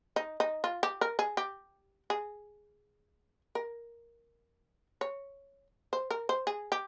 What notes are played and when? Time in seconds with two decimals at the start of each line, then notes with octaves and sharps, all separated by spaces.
0.16 D#4
0.40 D#4
0.64 F4
0.83 G4
1.01 A#4
1.19 G#4
1.37 G4
2.10 G#4
3.55 A#4
5.01 C#5
5.93 C5
6.11 A#4
6.29 C5
6.47 G#4
6.72 G4